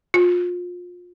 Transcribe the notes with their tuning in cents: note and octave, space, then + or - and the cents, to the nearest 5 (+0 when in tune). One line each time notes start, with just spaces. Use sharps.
F4 +25